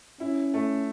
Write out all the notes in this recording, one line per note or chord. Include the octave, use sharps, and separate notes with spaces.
C#4 E4
A3